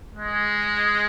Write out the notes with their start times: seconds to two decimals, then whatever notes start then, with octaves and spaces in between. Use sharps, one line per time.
0.15 G#3